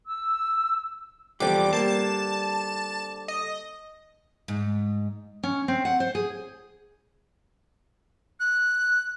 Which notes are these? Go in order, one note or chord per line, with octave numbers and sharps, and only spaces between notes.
E6
E2 D3 F3 G3 C4 D6
G3 A#3 A5
D#5
G#2
C#4
C4
F#5
C5
G#4
F#6